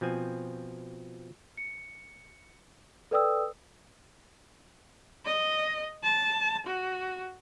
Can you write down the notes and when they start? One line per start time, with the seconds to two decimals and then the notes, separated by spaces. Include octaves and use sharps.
0.01 B2 F3 C4 G#5
1.57 C#7
3.11 A4 B4 D5 G5 D#6 E6
5.26 D#5
6.04 A5
6.67 F#4